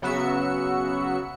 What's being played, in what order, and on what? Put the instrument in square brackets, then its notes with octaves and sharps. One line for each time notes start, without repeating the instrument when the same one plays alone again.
[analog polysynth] C#3 F#3 B3 F#4 E5 C#7